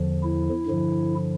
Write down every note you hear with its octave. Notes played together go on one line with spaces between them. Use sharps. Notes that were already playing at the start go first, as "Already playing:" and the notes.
Already playing: E2 D3 F3
E4
G2 D3 F3